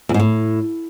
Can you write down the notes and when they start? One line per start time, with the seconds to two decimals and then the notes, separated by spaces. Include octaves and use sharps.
0.09 E2
0.14 G#2
0.19 A2